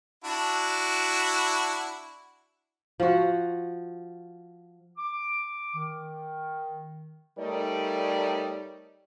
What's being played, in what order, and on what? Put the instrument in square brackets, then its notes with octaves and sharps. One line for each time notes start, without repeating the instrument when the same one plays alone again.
[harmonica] D4 E4 F#4
[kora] F3 F#4
[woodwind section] D6
D#3
[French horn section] G3 A3 D#4 A#4 C#5 D5